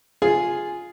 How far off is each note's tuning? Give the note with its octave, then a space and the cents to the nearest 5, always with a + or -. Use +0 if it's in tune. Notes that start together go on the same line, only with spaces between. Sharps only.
F4 +0 G#4 +0